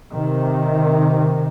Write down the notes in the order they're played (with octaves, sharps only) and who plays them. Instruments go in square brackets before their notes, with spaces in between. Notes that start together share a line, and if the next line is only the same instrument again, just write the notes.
[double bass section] C3 D#3